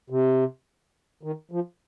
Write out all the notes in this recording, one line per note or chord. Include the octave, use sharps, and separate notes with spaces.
C3
D#3
F3